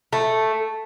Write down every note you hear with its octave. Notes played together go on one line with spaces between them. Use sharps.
A3